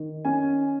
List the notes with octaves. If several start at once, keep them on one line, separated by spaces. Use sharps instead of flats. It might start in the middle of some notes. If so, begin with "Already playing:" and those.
Already playing: D#3
C#4 G#5